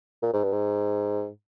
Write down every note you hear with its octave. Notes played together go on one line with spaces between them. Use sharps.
A#2
G#2
G2
G#2